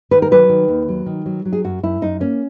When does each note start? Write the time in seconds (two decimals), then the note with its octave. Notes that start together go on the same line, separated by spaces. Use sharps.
0.11 D#3 B4
0.22 A#4
0.31 F#3 B4
0.49 D#3
0.68 D#2
0.88 F#3
1.06 D#3
1.26 F#3
1.45 F#3
1.53 G#4
1.64 F#2 F#4
1.83 F#2 E4
2.01 F#2 D#4
2.20 A#3 C#4